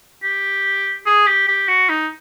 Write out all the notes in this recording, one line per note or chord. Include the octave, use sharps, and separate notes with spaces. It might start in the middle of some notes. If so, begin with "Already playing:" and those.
G4
G#4
G4
G4
F#4
D#4